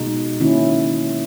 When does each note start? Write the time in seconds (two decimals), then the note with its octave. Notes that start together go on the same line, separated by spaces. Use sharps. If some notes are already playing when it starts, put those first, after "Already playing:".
Already playing: B2 G#3 D#4
0.40 D#3 A#3 C#4 E4